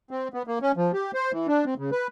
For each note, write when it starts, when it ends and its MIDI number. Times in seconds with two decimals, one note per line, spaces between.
0.11 0.28 60
0.34 0.43 59
0.47 0.59 58
0.62 0.72 61
0.77 0.92 53
0.93 1.11 67
1.14 1.32 72
1.32 1.47 52
1.48 1.65 62
1.66 1.74 60
1.78 1.90 49
1.92 2.07 71